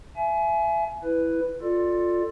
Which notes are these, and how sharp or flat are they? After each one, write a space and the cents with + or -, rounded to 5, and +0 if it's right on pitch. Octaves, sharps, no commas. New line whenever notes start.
E5 +30 G#5 +30
E4 +0 B4 +5
F4 +10 A4 +10 D5 +10